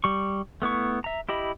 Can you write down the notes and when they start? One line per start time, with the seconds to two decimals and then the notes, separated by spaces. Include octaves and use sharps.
0.04 G3 C#6
0.62 A3 B3 E4 C#6
1.04 E5 A#5
1.29 E4 G4 D#5 B5